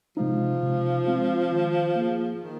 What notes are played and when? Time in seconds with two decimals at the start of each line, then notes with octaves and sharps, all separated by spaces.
0.17 C3 F3 G#3 D#4
0.63 C3
1.07 G#3 C4 F4
1.51 D#3
1.96 A#3
2.01 G#4
2.41 D#3